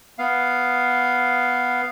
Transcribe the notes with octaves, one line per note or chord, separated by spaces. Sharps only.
B3 F5